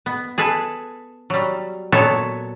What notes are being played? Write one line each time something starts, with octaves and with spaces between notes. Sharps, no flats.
B3
G#4 A4 B4
F#3 G3
A#2 F#3 B3 A4 C#5 G#5